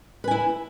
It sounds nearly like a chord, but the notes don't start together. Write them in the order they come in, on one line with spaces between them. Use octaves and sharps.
B4 G#5 E4